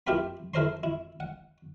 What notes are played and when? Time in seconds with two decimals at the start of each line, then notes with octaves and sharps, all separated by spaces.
0.07 E4 F4 G4 A#4 G5 B5
0.54 E4 A4 A#4 C5 A#5 C6
0.83 E4
1.20 F#5